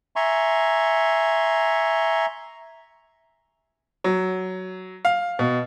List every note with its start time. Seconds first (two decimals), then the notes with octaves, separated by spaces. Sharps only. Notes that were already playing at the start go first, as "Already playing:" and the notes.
0.16 E5 G#5 A#5 C6 C#6
4.04 F#3
5.05 F5
5.39 B2